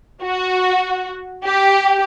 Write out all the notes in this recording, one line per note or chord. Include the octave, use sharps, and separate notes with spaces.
F#4
G4